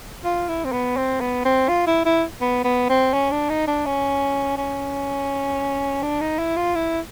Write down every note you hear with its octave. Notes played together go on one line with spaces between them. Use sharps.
F4
E4
C4
B3
C4
B3
C4
F4
E4
E4
B3
B3
C4
C#4
D4
D#4
D4
C#4
C#4
D4
D#4
E4
F4
E4